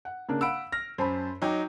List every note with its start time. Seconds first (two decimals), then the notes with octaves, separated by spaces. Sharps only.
0.05 F#5
0.29 C#3 A#3 D4
0.41 F5 F#5 B5 E6 D7
0.72 F6 A#6
0.98 F#2 C5 A5 B5
1.42 F#3 D#4 C#5 G5 D6